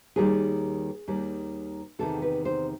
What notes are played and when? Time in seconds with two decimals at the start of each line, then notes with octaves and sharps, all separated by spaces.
0.16 D#2 D#3 G3 G#4
1.08 D#2 D#3 G3
1.99 E2 C3 D#3 A4
2.22 B4
2.45 C5